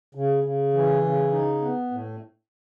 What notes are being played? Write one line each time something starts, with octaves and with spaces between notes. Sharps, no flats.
C#3
C#3
E3
C#3
D#4
B3
A2